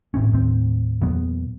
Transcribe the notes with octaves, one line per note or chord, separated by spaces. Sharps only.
G#1 A2 C4 C#4
D#2 A2 C4
E2 A#2 F#3 B3